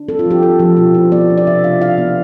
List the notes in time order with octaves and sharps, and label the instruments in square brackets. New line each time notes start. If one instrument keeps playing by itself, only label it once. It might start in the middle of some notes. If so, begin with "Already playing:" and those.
Already playing: [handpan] D4
C4 A4
F4
F3 G4
C4 A4
F3 A4
B2 F4
E4 F4
B3 D5
D4
D5
C3 E5
D4 F5
E4 F5
B3